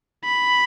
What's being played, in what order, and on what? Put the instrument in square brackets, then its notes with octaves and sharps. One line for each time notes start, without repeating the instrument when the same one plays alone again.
[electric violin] B5